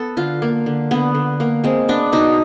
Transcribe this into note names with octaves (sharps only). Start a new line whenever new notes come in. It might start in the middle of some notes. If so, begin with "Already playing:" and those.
Already playing: B3 A4
D3 F4
A#3
D3
D3 B3
D3
A#3
G#3 C4
B3 D4
B2 D#4